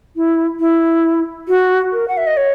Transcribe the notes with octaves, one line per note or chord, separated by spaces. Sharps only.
E4
E4
F#4
A#4
F#5
E5
D#5
C#5